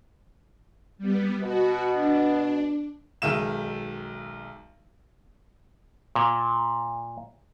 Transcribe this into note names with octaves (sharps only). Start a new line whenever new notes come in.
G3 B3
B2 F#4
D4
B1 D#3 G#3 E5 D#7 E7
A#2